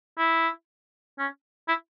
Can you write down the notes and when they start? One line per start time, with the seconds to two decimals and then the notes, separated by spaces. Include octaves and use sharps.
0.18 E4
1.18 C#4
1.68 E4